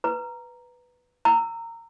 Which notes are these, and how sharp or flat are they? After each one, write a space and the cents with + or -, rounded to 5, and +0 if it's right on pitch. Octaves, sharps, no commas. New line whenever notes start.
B4 +0 A#5 +0
A#5 -20 E6 +10